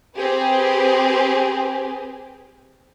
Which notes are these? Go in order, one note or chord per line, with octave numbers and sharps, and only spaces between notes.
C4 G4 G#4 B4